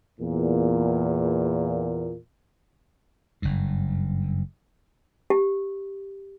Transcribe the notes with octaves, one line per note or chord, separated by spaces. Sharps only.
E2 A#2
F#1 G2
G4